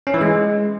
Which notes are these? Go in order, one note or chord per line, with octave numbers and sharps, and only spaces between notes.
C#4
E3
G#3